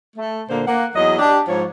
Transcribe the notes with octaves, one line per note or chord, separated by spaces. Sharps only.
A3
A#2 D3 A#3 C5
A#3 F#5
E2 F#3 D#5
D4 G4
G#2 F3 C#5